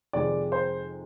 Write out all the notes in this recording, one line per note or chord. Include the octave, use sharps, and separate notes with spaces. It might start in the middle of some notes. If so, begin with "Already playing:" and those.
F2 C3 D#3 G#3 D5
C5